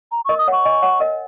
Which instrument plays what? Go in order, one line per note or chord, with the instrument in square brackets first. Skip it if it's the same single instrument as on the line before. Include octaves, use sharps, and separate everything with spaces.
[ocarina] A#5
[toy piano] A#4 D#5 [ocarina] C#6
[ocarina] D#6
[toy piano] C#5 F#5 [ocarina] C#6
[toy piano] D#5 G#5
C#5 F#5
A#4 D#5